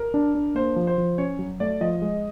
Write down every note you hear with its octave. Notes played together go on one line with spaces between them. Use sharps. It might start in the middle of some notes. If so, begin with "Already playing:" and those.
Already playing: A#4
D4
D4
A#3 C5
F3
C5
F3
C#4 C#5
F#3
A3 D5
F3 D#5
G#3